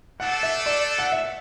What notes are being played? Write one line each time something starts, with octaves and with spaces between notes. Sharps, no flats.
A3 D4 A4 F#5
E5
D5
F#5
E5